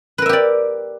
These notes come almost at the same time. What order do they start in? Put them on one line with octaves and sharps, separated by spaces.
B4 A#4 E5 G4 D5